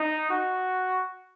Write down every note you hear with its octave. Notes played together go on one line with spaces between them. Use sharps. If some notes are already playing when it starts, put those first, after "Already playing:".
Already playing: D#4
F#4